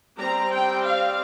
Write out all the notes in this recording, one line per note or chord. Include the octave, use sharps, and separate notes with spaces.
G3 C4 A#5
G5
F5